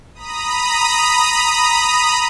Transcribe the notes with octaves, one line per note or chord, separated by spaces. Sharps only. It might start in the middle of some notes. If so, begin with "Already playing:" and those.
A#5 B5 D#6